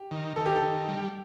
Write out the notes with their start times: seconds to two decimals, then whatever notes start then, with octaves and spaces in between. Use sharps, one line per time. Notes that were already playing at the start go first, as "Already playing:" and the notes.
Already playing: G4
0.11 D#3
0.36 D#3 A4
0.46 G4
0.56 A4
0.62 D#3
0.88 G3